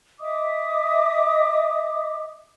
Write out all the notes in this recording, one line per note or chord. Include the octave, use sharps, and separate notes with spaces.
D#5 E5 D6 D#6